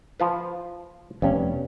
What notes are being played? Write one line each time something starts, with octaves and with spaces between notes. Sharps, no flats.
F3 F4 B4
F1 G2 B3 C#4